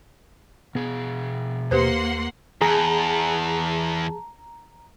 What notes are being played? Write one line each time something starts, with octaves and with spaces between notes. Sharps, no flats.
B2 B3 G#4
D#2 A#3 G4 B4 C5 F#5 C6
E2 G#4 A5 A#5